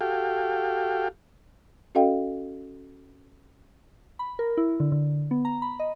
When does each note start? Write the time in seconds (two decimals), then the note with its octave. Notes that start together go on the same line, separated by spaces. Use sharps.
0.01 F#4 G4 A4 F5 G5
1.95 C#4 F#4 A4 D#5 F5 G5
4.19 B5
4.39 A#4
4.57 E4
4.80 D3
4.92 D3
5.31 B3
5.45 A#5
5.62 B5
5.79 D#5